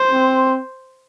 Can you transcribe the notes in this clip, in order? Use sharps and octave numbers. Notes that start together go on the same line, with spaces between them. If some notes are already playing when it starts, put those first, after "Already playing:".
Already playing: C5
C4